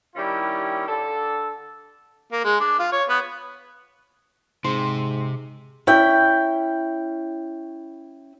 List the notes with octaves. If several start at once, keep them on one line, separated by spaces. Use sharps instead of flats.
D#3 G3 C#4 E4 G4
D3 D4 A4
A#3
G#3
D4
F4
C#5
B3
G#2 C3 C5
C#4 E4 G5